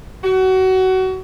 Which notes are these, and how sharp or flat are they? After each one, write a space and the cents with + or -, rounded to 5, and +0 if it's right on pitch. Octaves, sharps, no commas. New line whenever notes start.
F#4 +25